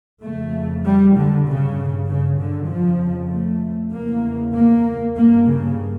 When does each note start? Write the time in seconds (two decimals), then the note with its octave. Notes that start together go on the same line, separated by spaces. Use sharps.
0.24 F2 C#3 A3
0.85 G3
1.16 D3
1.47 G2 C#3
2.08 C#3
2.40 D3
2.70 F2 C#3 F3
3.31 A3
3.93 E2 C#3 A#3
4.54 A#3
5.16 G2 A#3
5.47 C#3